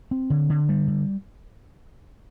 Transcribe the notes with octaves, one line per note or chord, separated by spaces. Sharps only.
C4
D3
D3
G3
D3